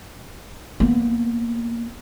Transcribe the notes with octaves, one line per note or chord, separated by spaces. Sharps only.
A#3 B3